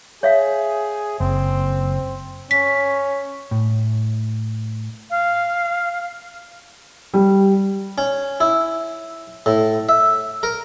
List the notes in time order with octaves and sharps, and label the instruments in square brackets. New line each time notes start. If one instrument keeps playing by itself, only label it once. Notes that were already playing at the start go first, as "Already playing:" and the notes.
[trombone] G#4 [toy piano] C#5 E5 F5
[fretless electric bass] F#1 [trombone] C4
[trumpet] C#4 [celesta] B6
[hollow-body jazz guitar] A2
[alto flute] F5
[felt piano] G3
[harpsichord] C#4
E4
A2
E5
A#4